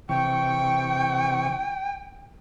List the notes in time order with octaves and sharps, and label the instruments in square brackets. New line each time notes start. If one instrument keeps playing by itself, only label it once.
[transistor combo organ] C3 E3 C#6 [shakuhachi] G5